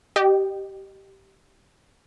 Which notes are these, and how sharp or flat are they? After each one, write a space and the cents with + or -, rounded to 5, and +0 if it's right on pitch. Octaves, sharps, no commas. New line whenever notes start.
G4 -15 D#5 -25 G5 +0